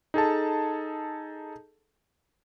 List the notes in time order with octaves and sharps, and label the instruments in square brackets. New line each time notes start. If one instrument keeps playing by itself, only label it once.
[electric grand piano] D#4 G#4 A4 A5